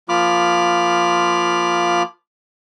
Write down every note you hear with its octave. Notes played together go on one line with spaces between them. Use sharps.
F3 A#3 F4 B5 D6 F6